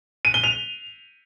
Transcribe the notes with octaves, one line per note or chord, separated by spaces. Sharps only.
D#7
G7
F7